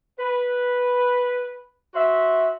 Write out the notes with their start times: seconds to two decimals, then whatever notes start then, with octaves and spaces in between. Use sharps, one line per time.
0.19 B4
1.95 F#4 C5 E5